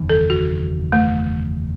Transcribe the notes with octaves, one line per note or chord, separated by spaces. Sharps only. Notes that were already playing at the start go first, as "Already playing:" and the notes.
Already playing: F#1 E2 D#3
A4
F#4
A3